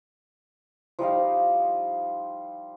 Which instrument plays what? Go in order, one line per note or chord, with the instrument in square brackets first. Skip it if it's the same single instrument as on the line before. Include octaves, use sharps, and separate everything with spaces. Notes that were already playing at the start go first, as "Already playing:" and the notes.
[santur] F3 G3 D#4 F5